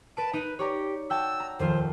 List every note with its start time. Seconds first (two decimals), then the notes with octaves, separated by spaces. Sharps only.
0.17 B4 A5 D7
0.33 D#4 B4 D#7
0.59 G4 C#5 D5 A#5
1.10 F#4 G5 A5 E6
1.40 A#5
1.59 D#1 F2 F4 C5